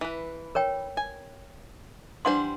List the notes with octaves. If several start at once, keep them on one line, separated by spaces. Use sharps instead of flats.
E3 B4
A#4 C#5 G5
G#5
E3 G3 D4 C5 F#5 C6